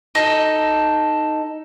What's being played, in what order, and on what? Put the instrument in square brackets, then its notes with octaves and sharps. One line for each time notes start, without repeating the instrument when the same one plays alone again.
[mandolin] D#4 A4